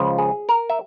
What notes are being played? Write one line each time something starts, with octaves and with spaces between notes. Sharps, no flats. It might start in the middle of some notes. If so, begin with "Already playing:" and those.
Already playing: C#2 C#3 F3
G#4
A#4
E5